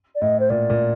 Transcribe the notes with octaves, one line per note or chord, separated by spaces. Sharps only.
D5
A2 D#5
C5
A#2 D5
A#2